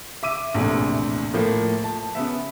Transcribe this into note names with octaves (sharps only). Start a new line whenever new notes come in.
E5 D6 D#7
A#1 E2 A2 C3
A2 F3 A#3
A5
C#3 B3 E5